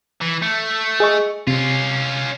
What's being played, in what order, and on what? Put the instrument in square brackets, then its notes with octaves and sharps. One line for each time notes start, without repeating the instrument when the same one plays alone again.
[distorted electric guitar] E3
A3
[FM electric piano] G#4 D#5 C#6
[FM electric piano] C3 [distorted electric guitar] C#4 F4